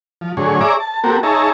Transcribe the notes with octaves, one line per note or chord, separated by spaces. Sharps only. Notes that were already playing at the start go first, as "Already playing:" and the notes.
F3
A2 D3 F#3 G#4 C#5
G#4 C#5 D5 E5 A#5 D6
A5
A#3 C4 F#4 G4 A4 A#4
D#4 G#4 C#5 E5 A5 A#5